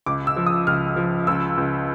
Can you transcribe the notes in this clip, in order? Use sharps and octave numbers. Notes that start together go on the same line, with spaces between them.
C#2 D6
E6
F3
D#6
C#2 F6
F3
C#2 E6
C#2